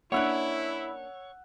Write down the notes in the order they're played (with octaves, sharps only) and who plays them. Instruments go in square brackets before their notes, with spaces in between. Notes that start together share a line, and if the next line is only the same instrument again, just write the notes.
[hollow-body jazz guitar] A#3 C#4 D4 [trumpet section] E4 [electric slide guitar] C#5 [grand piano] F#5 E6 F#6